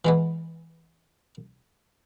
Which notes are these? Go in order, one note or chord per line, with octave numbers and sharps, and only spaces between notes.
E3 G#3 B3